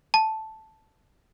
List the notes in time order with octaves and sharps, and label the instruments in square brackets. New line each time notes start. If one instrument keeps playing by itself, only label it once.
[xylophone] A5